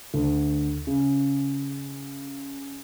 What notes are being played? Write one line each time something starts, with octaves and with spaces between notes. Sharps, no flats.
D2
C#3